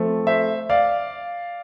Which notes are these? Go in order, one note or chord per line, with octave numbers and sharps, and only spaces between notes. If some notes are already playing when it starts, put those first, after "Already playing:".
Already playing: F3 A3 C4
C5 E5
D5 F5